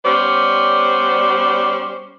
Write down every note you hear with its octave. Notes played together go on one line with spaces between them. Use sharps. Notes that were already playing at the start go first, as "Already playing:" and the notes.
G3 B3 C#4 C5 D5